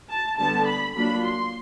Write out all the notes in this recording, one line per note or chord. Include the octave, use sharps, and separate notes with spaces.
A5
D3 G3 B3 A5
B5
F#3 A#3 D4 F4 B5
C6